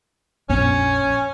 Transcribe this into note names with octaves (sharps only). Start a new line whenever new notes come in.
A#1 F2 B3 C#4